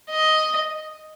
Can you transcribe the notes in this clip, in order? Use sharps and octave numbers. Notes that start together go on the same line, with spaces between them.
D#5